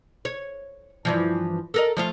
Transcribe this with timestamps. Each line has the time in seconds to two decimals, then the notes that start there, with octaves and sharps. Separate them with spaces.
0.25 C#5
1.05 G2 E3 F3
1.74 A4 A#4 D#5
1.97 F3 A3 F4